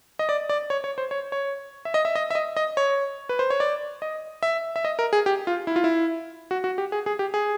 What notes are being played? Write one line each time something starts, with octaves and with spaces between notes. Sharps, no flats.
D#5
D5
D5
C#5
C#5
C5
C#5
C#5
E5
D#5
E5
D#5
E5
D#5
D#5
C#5
B4
C5
C#5
D5
D#5
E5
E5
D#5
A#4
G#4
G4
F4
E4
F4
E4
F#4
F#4
G4
G#4
G#4
G4
G#4